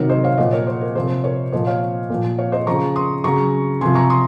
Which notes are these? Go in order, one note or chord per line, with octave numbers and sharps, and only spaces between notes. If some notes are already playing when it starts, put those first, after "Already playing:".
Already playing: C3 D#3 F#3 A#4 C#5
C5 D#5
C#5 F5
A#2 F3 D#5 F#5
A#4 C#5
C5
A#4
C3 F3 C5
A#4 C#5
A#2 F3 C5 D#5
C#5 F5
A#2 F3
C#5 F5
C5 D#5
C#3 F3 A#5 C#6
C6 D#6
C#3 F#3 A#5 C#6
C3 F3 G#5 C6
A#5 C#6
C6 D#6